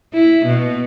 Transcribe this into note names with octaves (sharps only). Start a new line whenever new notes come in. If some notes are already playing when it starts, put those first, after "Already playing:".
E4
B2